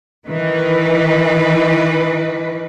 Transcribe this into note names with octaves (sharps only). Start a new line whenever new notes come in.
D#3 E3 B4